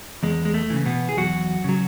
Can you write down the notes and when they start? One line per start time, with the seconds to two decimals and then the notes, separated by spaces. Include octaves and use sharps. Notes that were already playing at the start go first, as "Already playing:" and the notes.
0.23 E2 G#3
0.45 G#3
0.54 A3
0.70 C#3 E3
0.86 B2 B3
1.09 G#4
1.17 E2 F#3 F#4
1.64 C#3 F#3